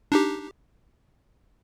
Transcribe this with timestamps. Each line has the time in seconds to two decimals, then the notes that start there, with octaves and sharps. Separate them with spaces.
0.12 D4 D#4 G4